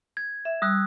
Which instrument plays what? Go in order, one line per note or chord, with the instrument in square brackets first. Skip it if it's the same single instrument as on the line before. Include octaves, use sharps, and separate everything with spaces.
[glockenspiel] G#6
[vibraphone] E5
[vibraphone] G3 [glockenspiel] D#6 E6 F#6